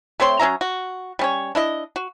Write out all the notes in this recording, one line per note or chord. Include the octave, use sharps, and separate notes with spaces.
A3 C4 C#5 C6
F#3 C#4 E5 A#5
F#4
G3 C#4 C#5
D4 E4 D#5
F#4